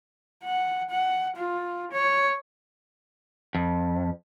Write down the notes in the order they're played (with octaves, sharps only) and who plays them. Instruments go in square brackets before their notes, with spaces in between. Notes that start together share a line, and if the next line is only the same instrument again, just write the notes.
[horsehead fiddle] F#5
F#5
F4
C#5
[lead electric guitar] F2